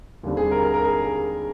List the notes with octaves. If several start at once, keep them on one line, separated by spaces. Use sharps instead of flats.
D#2 D3 G3 C4
G#4
A#4
A#4
A#4
G#4